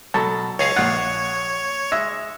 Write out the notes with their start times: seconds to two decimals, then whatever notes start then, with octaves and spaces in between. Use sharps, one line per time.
0.14 B2 F#3 A4 A5
0.59 C#2 G#4 C#5 F5
0.76 A#1 F4 F#5
1.92 G#3 E5